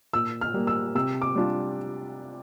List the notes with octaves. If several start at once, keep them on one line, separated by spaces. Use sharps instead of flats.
A#2 E6
F6
G3 A#3
E6
C3 E6
D6
G3 D4 F4